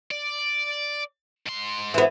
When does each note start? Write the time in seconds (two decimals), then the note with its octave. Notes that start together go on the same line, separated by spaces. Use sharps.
0.11 D5
1.46 G#2 C6
1.94 E3 B3